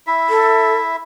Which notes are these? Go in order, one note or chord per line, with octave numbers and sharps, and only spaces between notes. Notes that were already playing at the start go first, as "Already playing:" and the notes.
E4 E5
A4